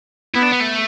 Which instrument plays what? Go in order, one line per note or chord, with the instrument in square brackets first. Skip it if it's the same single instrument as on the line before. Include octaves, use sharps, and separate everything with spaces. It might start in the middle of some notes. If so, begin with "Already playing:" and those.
[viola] B3 [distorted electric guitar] E4
[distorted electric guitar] D4
B3
A3